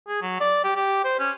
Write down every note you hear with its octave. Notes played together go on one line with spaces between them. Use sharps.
G#4
F#3
D5
G4
G4
C5
C#4